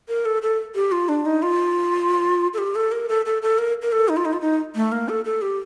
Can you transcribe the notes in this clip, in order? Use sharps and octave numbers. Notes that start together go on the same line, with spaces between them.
A#4
A4
A4
G4
F4
D4
D#4
F4
A4
G4
A4
A#4
A4
A4
A4
A#4
A#4
A4
D#4
F4
D#4
F4
D#4
A3
A#3
A4
A4
G4